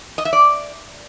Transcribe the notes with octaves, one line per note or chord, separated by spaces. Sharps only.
D#5
E5
D5